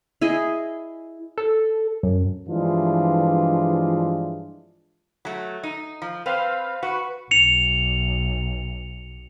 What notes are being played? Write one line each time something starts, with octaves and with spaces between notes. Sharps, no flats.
E4 G#4 D#5
A4
F#2
G2 E3 F3 G#3 D4 F4
F#3 A3
D#4
F3
C4 B4 C5 F5
F#4 B4 C#6
B1 C#7 F7